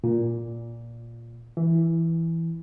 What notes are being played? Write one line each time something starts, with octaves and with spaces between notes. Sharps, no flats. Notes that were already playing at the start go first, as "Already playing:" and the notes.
A#2
E3